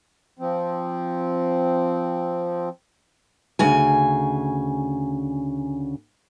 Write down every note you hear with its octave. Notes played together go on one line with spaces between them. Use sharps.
F3 C4
D2 C#3 G#5